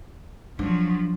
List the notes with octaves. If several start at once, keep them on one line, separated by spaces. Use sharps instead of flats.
F3 F#3 D4